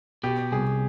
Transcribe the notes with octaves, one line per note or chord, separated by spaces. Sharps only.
B2 G4
C2 G#4